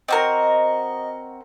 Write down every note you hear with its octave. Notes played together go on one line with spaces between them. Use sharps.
C4 F#4 A#4 D#5